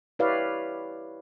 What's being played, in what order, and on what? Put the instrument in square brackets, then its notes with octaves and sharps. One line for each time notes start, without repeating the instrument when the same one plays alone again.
[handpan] E4 G4 B4 C#5 D5 F5